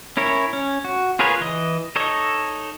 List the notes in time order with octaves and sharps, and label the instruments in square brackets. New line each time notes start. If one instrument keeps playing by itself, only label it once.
[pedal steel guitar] C#4 E4 A#4 C#5
C#4
F#4
F4 G#4 A#4 B4 C#5
E3 D#5
D#4 A4 C#5 D#5